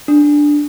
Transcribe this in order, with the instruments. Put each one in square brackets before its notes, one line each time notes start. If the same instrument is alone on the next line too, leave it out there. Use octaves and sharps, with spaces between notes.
[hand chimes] D4